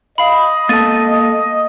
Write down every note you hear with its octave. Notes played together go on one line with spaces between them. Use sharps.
D#5 F5 B5
A#3 A4 A5 A6 D#7